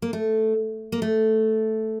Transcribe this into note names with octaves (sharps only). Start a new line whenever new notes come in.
A#3
A3
A#3
A3